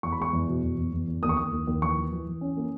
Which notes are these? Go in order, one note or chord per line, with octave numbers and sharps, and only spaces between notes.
E2 C#6
B5
G#3 C#6
E2
B2
E2
E2
E2
E2
D#2 D#6
C#6
D#2 D#6
D#2
D#2
E3 C#6
E3
E3
E3
C#4
A#3